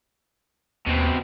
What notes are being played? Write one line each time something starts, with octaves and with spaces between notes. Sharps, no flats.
D#2 B2 C4